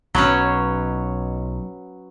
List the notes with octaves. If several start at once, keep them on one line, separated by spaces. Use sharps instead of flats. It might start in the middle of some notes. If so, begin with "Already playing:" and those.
B1 F#3 B3 C#4